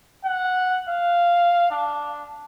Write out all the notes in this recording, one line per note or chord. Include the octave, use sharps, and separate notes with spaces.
F#5
F5
D4